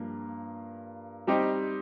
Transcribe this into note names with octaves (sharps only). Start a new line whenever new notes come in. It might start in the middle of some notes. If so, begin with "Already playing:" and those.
Already playing: G2 F3 A#3
G3 C4 D#4 G4